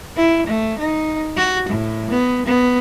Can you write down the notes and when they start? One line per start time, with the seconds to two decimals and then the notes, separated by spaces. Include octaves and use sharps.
0.16 E4
0.47 A3
0.79 D#4
1.37 F#4
1.69 A2
2.10 B3
2.46 B3